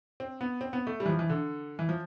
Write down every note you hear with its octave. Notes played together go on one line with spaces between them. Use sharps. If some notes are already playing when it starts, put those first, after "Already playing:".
C4
B3
C4
B3
A3
G3
E3
F3
E3
D3
E3
F3